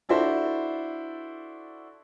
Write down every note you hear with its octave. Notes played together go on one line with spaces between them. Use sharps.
D4 E4 F#4 A4 C5